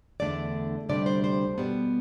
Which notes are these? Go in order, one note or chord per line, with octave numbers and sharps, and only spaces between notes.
E2 D3 A3 D4 D5
D2 C3 G3 D4 D5
C5
C5
B2 G3 B3